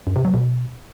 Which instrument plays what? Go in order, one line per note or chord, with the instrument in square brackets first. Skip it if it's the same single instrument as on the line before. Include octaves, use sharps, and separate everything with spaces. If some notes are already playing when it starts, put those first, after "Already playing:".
[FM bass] F#2
C3
F#3
B2